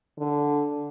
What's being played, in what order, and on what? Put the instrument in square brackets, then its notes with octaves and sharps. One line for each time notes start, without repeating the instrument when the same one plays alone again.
[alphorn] D3